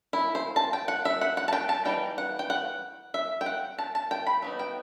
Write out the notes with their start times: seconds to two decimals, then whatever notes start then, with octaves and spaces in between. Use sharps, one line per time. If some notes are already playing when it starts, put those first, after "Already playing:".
0.13 E4
0.35 C5
0.56 A5
0.73 G5
0.88 F#5
1.05 E5
1.21 F#5
1.37 F#5
1.48 A5
1.53 G5
1.69 A5
1.85 E3 G3 D#4 G5
2.18 F#5
2.39 G5
2.50 F#5
3.14 E5
3.41 G5
3.46 F#5
3.78 A5
3.95 A5
4.11 G5
4.27 B5
4.42 F#3 B3 D#4
4.59 G5